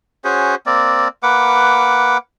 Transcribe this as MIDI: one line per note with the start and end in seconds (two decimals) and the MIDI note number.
0.24 0.55 61
0.24 0.55 66
0.24 0.55 68
0.24 0.55 72
0.66 1.08 58
0.66 1.08 60
0.66 1.08 74
1.23 2.17 58
1.23 2.17 71
1.23 2.17 78
1.23 2.17 86